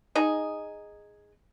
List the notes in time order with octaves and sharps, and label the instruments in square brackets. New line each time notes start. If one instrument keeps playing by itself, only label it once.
[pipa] D#4 G#4